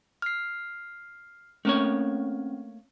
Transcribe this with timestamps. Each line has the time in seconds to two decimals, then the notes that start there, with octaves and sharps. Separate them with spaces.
0.22 F6 C7
1.65 A3 A#3 C4 C#4 C#5